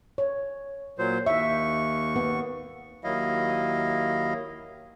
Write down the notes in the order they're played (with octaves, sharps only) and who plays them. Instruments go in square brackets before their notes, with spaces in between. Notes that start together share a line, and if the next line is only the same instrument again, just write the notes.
[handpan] C#5
[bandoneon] A#2 F#3 C5
[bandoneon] D#2 C#6 [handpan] E5
[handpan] B3
[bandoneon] D#2 D#3 F#3 E4 D#5 F5